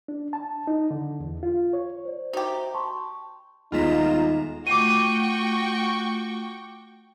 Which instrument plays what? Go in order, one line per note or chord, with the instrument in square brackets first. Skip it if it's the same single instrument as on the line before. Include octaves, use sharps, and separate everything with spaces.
[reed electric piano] D4
A5
D#4
D3
E2
F4
C#5
[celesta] C5 D5
[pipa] D#4 G4 [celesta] F#4 C5 E5
[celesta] A5 C6 C#6
[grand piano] D#1 G#3 B6 [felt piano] B3 [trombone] D#4 [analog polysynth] F4 A#5 E7
[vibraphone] A3 F4 [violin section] F#4 G5 C#6 [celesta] D6 D#7